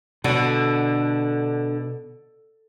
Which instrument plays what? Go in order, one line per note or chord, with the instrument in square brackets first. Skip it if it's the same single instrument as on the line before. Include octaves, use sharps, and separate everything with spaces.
[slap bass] B2 [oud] D3